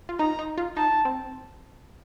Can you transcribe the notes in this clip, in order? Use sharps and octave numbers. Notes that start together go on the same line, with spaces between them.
F4
D#4 A#5
D#4
F4
D#4 A5
C4